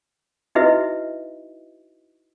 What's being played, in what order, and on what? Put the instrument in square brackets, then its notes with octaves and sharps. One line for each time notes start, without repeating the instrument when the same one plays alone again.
[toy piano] D#4 E4 F#4 B4 D#5 E5